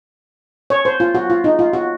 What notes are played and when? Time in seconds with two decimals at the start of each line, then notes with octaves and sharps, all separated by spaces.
0.70 C#5
0.85 C5
1.00 F4
1.15 F#4
1.30 F4
1.44 D#4
1.59 F4
1.73 F#4